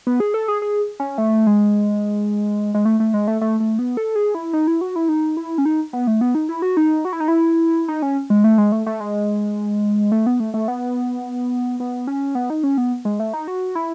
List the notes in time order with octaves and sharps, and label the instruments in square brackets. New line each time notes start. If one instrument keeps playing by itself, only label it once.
[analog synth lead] B3
G#4
A4
G#4
G#4
C#4
A3
G#3
G#3
A3
A3
G#3
A3
A3
A3
B3
A4
G#4
E4
D#4
E4
F#4
E4
D#4
E4
C#4
D#4
B3
A3
B3
D#4
E4
F#4
D#4
F#4
E4
D#4
E4
D#4
C#4
G#3
A3
G#3
A3
A3
G#3
A3
B3
A3
A3
B3
B3
C#4
B3
D#4
C#4
B3
G#3
A3
D#4
F#4
E4